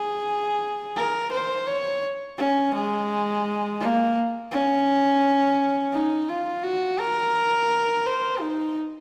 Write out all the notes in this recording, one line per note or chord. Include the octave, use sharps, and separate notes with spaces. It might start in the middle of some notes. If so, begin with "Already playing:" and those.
Already playing: G#4
A#4
C5
C#5
C#4
G#3
A#3
C#4
D#4
F4
F#4
A#4
C5
D#4